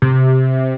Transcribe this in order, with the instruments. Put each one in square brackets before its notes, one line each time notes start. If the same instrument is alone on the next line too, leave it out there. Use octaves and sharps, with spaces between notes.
[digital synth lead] C3